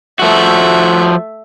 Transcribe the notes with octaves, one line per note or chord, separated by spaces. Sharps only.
F3 A3 F#4 E5